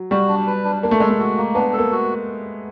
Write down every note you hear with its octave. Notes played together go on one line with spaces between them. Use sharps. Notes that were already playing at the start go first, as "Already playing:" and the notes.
Already playing: F#3
G3 F#4
D4
B4
D4
A#3 D4
A3
G#3 A4
A3
F#4
A#3
B3 D4
A4
A#3
F#4